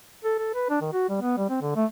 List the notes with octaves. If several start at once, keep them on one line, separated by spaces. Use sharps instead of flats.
A4
A4
B4
D4
D#3
F#4
G3
B3
G3
C4
D3
A3